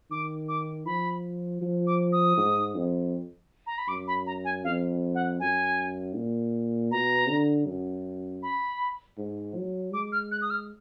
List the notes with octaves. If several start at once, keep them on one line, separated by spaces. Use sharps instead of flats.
D#3 D6
D6
F3 B5
F3
D6
D#6
G#2
F2
A#5
B5
F#2 D6
B5
A#5
G#5
F2 F5
F#5
F#2 G#5
A#2
B2 A#5
D3
F#2
B5
G#2
F#3
G#3 D6
F6
F#6
D#6
F6